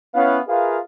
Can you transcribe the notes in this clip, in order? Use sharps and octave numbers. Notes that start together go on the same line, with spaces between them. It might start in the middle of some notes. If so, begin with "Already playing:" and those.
B3 C#4 E4 F5
F4 G#4 A#4 B4 E5 F5